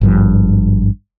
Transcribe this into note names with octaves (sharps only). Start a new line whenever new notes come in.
G#1 G2 F3